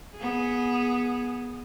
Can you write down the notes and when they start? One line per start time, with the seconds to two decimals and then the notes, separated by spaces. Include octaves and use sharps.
0.16 B3 G#4